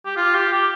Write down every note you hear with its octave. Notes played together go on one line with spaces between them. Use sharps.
G4
F4
G4
G4